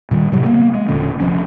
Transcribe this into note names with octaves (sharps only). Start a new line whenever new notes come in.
A#2 D#3 G3
A2 C3 F#3
A#3 B3
G#3
E1 A#2 D3 C#4
F1 F2 F3 C#4